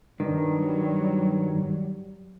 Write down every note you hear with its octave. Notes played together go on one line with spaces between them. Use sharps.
G2 D#3 F#3 G3